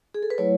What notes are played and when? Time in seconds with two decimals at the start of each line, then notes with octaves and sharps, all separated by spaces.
0.14 G#4
0.23 A4
0.30 B4
0.38 F#3 A3 E4 C#5